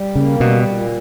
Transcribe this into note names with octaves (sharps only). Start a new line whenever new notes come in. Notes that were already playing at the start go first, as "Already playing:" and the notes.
Already playing: G3
C#3 A#3
B2 G3
A#2